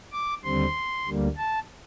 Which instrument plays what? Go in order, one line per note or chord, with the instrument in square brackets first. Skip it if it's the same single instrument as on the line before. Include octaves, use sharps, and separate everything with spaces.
[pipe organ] D6
D#2 D3 G3 C4 C6
D2 D3 G3 A#3
A5